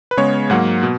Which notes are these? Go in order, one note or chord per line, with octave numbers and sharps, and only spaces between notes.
B4
C#3 G#3 B3 C#5
G#2 F#3 A#3 F#5
B2